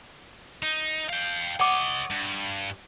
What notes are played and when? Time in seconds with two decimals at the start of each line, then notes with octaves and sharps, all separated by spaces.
0.62 D#4
1.09 F5 G5
1.60 C#5 D#5 F#5 D6
2.10 G2